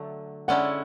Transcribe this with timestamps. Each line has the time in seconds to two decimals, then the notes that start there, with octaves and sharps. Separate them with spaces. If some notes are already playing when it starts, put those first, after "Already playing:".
Already playing: D3 F#3 A3
0.48 D3 G#3 C#4 E4 A4 D5 F#5